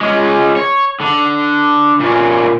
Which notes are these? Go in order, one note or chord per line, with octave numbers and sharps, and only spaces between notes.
G#3 C#4
C#5
D3
A#2 C#4